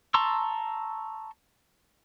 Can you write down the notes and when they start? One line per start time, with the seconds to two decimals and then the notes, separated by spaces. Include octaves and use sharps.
0.14 A5 A#5 C6 C#6 E6